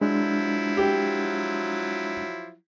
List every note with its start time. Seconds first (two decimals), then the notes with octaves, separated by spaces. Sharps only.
0.01 F3 F#3 G#3 D4 E4
0.77 G4